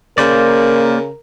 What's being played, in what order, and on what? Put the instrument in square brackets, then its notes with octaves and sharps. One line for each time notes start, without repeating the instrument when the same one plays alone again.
[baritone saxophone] C#3 [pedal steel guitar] A#3 C5 D5 [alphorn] A#4